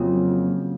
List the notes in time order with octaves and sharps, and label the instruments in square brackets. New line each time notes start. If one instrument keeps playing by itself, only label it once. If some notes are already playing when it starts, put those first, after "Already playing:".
Already playing: [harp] F2 C#3 F#3 A#3 F4